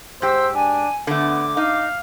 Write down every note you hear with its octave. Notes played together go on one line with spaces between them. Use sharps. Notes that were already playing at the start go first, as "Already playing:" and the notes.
G#2 G4 C5 E6
D4 G#5
D3 A3 B3 D6
D#4 F5